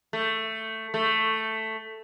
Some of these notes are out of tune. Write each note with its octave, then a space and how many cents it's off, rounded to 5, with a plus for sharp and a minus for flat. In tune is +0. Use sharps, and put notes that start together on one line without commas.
A3 +10
A3 +5